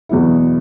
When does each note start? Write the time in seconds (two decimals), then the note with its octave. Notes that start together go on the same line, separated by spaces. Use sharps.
0.09 E2 B2 F#3 B3 E4